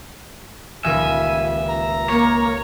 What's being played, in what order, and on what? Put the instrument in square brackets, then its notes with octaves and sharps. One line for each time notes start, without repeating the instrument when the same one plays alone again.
[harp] D#1 C#2 [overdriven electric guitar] E5 [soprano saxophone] G#5
[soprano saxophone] A#5
[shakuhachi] A#3 [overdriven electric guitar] C#5